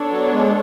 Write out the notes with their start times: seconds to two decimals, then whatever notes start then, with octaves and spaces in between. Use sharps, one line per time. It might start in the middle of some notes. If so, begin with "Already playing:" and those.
Already playing: B3 D4 A4 C#5
0.11 F#3
0.33 G#3